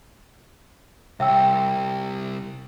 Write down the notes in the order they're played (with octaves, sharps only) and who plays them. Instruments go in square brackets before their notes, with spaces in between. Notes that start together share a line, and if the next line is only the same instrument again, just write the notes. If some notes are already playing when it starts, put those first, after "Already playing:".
[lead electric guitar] C2 [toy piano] E5 G5 E6